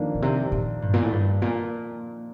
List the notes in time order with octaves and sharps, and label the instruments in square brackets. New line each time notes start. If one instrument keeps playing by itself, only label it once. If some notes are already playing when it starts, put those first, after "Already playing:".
Already playing: [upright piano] F2 D#3 A#3 D4
[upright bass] A#2
C3
A#2
G2
A#2
A2
G2
A#2